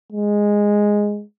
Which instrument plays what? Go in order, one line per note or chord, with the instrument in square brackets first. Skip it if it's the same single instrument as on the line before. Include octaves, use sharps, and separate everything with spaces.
[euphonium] G#3